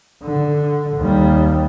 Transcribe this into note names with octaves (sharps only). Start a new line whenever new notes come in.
D3
D#2 G3